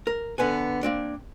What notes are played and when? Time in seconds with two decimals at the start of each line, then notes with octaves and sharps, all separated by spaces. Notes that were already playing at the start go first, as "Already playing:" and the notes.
0.07 A#4
0.38 D3 B3 B4 G#5
0.83 A#3 C4 D4